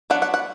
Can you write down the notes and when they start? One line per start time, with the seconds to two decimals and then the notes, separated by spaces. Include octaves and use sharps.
0.10 F#3 B3 D4 F#5
0.22 F#5
0.34 F#5